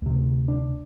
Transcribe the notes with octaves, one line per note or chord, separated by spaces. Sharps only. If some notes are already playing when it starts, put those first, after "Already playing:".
D2 C3
D4